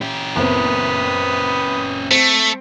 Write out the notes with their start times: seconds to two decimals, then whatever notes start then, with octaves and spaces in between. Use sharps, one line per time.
0.01 C#4 G4
0.36 F#1 B3 C4 B4 D#6
2.11 A3 C4 D7